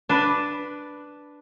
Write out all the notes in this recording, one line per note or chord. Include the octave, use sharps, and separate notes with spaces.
D4 B4